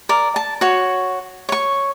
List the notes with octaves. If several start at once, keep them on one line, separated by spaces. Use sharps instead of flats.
A#4 D5
A5
F#4 C#5
C#5 C#6